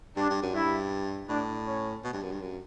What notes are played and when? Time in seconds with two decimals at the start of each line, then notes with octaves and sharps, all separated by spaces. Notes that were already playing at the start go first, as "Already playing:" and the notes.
0.17 G2 D4
0.30 G2
0.42 F#2
0.54 G2 E4
1.29 A2 D4
1.66 C#4
2.04 B2
2.13 G2
2.23 F#2
2.32 G2
2.41 F#2